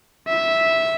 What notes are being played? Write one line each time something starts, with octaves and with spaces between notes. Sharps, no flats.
E5